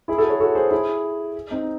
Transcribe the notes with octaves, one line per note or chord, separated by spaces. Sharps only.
E4 G#4
F#4 A4
A4 C#5
F#4 A4
G#4 C5
E4 G#4
C4 D#4